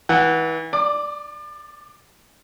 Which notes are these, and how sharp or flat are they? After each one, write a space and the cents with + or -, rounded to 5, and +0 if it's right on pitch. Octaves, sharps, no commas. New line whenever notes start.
E3 -25 F#5 +0
D5 +0 D6 +35